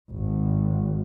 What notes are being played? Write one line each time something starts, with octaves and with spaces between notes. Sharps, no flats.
G#1